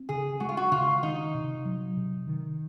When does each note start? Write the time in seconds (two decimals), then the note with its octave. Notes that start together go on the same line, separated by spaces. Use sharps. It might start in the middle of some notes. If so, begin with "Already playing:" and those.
Already playing: C4
0.09 C#3 G#4
0.40 G#3 F#4
0.49 F4
0.57 F#4
0.72 C#3 F4
1.03 D#3 D#4
1.34 C3
1.65 F#3
1.97 C3
2.27 D#3